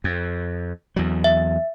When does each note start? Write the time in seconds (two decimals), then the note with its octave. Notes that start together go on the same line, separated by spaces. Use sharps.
0.04 F2
0.96 E2 F#3
1.24 E5